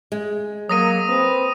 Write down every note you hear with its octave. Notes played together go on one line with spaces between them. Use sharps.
G#3
F#3 A#3 D#6 A#6 D#7
C4 B4